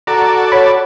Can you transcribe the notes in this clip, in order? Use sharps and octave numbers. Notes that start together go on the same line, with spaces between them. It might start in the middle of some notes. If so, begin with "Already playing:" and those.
F#4 A4 D5 A#5
C#5 B5